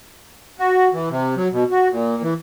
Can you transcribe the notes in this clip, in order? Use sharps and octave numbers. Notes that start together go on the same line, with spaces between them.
F#4
E3
C3
F#3
B2
F#4
A#2
E3